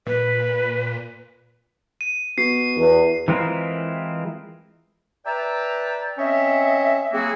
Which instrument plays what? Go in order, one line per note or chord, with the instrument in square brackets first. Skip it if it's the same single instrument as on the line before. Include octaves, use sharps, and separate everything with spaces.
[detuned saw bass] A#2 [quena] B4
[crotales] D#7
[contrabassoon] B2 [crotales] C7
[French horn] E2 [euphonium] B4
[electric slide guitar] E3 G#3 C4 E4 F4 A#4
[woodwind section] B4 D5 E5 G5 A5 A#5
C4 C#4 C#5 D#5 E5
F#3 A#3 C4 E4 F#4 G#4